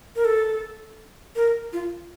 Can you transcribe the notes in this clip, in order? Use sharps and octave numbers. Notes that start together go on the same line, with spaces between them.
A#4
A4
A#4
F4